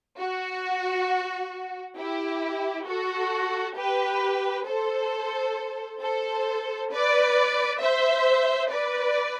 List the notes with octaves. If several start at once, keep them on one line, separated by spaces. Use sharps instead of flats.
F#4
E4 G4
F#4 A4
G4 B4
A4 C5
A4 C5
B4 D5
C5 E5
B4 D5